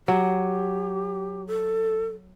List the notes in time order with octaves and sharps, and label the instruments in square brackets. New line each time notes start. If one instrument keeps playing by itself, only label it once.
[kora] F#3 [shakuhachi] G4
[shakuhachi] A4